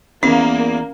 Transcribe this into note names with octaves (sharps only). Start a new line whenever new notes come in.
E2 A#3 C#4